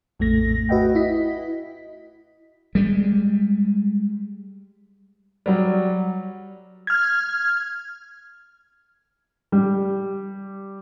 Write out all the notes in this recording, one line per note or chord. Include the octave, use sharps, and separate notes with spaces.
A#1 F2 A2 A3 A#6
F#4 B4 D#5 E5 F#5 G5
E4 D#5 B6
G3 G#3
F#3 G3
F6 G#6
G3